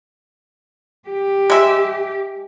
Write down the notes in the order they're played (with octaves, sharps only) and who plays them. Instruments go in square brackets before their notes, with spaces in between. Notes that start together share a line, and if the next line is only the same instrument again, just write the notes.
[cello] G4
[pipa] G#3 E5